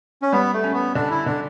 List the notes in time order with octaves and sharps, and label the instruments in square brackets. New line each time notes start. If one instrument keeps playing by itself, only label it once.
[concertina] C#4
[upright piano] G3 [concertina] B3
[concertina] A3
[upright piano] C#4
[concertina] B3
[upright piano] D3 [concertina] D4
[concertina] E4
[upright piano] D3 [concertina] D4